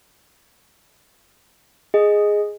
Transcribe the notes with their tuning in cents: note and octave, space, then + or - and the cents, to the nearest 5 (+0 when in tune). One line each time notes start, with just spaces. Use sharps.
G#4 +0 D#5 +0